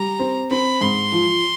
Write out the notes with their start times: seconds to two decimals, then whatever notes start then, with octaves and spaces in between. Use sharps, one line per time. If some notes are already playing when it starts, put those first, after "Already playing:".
Already playing: G3 A#5
0.19 C4
0.51 C4 B5
0.81 G#2 C6
1.12 F3